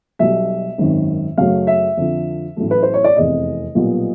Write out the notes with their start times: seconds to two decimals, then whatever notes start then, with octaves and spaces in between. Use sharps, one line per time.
0.19 B1 B2 G3 E5
0.78 G#1 F#2 D#3
1.38 F#2 C#3 F#3 A3 F5
1.67 E5
1.97 F2 D3 F3
2.57 A1 A2 F#3 A3
2.71 B4
2.83 C5
2.94 C#5
3.04 D5
3.16 F1 E2 C3 D#5
3.75 B1 A#2 G3 B3